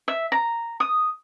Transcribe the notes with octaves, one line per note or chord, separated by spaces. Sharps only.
E5
A#5
D#6